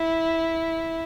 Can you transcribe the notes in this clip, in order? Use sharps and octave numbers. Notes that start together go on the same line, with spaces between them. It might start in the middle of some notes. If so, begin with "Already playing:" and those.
Already playing: E4